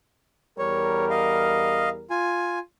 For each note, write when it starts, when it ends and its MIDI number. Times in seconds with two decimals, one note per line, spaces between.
0.58 2.10 40
0.58 2.10 55
0.58 2.10 70
0.58 1.05 73
1.10 1.89 75
1.10 1.89 77
2.10 2.59 65
2.10 2.59 80